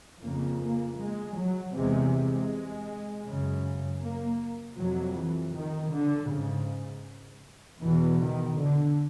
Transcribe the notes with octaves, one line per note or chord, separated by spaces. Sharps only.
F2 C#3 A#3
A#3
G#3
F#3
E2 C3 G#3
G#3
F#2 C#3
A#3
F2 C3 F#3
E3
D#3
D3
G#2 C#3
E2 B2 E3
D#3
D3